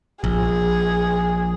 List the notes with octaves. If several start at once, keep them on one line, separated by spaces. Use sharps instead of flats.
A#1 G#4